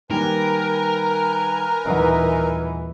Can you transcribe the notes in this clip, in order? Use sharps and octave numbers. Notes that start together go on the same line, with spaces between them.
D#3 G3 A#3 A#4 B4 G#5 A#5
D#1 E3 D#4 F#5